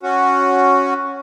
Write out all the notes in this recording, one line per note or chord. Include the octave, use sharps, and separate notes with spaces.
C#4 F#4